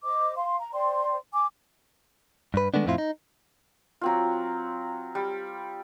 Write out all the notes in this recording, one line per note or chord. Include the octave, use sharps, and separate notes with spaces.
C5 D#5 D6
F5 C6
A#5
C5 D5 G5 C6
G#5 D6
G2 B4
D#3 G#3 A3 B3 D4
F2 A2 C4 E4 F4
D#4
F#3 C4 F4
G3